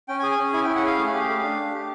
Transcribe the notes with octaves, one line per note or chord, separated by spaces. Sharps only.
C#4 G5
G#5
G#4
G#5
C#4
E4 G#5
G5
C#4
F#5
G#4 F5
A3
G4
A3
D4
A3
G4